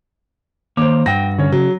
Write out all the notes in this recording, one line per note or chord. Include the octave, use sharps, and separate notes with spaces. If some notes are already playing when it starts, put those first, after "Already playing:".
D#3 A#3 C5 C#5 D6
G2 F#4 G5 A#6
D3 C#4 C#5
C#3 F#3